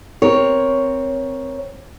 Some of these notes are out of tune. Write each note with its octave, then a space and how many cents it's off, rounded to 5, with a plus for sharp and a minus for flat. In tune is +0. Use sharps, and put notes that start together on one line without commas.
C4 +0 A#4 +15 C#5 +0